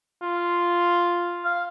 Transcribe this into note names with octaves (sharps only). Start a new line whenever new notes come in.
F4
F5